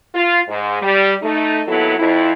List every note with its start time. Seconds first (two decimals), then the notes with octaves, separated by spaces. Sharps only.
0.14 F4
0.48 G#2
0.80 G3
1.22 A3 D#4
1.67 D#2 F#3 B3 E4 A4
1.97 F2 E4